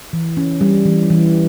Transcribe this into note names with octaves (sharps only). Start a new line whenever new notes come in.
E3
C#4
G3
E3
E3